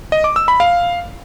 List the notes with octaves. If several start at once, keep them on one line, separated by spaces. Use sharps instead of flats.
D#5
D6
E6
B5
F5